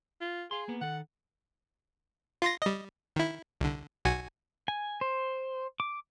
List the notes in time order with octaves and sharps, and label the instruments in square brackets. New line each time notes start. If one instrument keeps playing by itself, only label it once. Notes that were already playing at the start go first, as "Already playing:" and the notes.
[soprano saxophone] F4
[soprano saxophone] G#4 [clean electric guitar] F5 C6
[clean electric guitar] A#3 B3
[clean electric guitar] D#3 A4 [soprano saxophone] F#5
[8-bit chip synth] F4 C6 A#6
G3 D#5
D#3 E4
C2 D3
B1 F#4 G#5
[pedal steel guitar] G#5
C5
D6